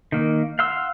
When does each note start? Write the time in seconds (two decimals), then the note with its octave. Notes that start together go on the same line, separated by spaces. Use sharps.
0.12 D#3 A#3
0.59 F5 F#5 C6 E6